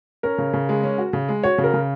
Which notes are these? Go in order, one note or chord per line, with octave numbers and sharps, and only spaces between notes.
C#4 A#4
C#3
C#3
G#3
C#4
F#4
C#3
G#3
F#4 C#5
C#3
A#4
C#3